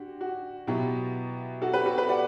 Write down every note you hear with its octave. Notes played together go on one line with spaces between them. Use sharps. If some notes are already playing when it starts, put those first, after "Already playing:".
Already playing: D3 F#4 G4
F#4
B2 F#3 B3 E4 G4
F#4 A4
G4 B4
F#4 A4
G4 B4
D5 F#5